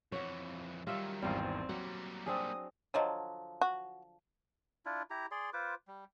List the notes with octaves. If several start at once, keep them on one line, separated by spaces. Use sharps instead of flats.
F2 E3 C#5 F#5
D#3 F#3 G3 F4 E5
G#1 E2 G3 C4 F5
F#3 G3 A#3 F#5
C4 D4 G#4 D#6
D3 F3 F#3 C#5 D#5
F#4
D4 E4 F4
E4 G4 A#5
G#4 D5 C6
F4 B4 C5 D6
G3